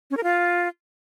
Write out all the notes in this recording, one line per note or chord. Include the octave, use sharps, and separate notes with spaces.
C#4
A#4
F4